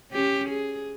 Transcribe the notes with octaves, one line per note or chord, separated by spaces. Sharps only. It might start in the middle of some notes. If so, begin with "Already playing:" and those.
C#4 G4
G#4